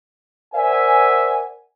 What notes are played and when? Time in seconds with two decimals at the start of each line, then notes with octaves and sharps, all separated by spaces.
0.54 A#4 C5 D5 E5 F#5 G#5